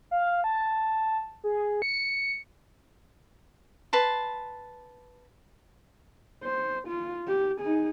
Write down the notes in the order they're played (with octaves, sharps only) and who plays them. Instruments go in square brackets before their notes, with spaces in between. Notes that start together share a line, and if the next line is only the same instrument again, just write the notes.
[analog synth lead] F5
A5
G#4
C#7
[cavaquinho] B4 A5 C6
[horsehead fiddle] C5
F4
G4
D#4 G#4